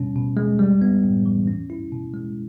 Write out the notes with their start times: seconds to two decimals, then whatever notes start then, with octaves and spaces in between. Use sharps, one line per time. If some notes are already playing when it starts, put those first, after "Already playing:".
Already playing: B2 G3 C#4
0.16 B2
0.37 G#3
0.59 G3
0.81 B3
1.03 A2
1.26 E3
1.47 C#4
1.70 E4
1.92 B2
2.14 G#3